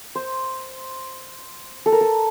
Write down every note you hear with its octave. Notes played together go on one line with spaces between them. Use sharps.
C5
A4
A#4
A4